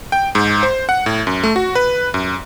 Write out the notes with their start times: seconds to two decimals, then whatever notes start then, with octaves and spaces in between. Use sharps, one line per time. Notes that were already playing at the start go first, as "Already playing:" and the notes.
0.12 G5
0.35 G#2
0.63 C5
0.89 F#5
1.06 A2
1.27 F#2
1.44 A3
1.56 F#4
1.75 B4
2.14 F#2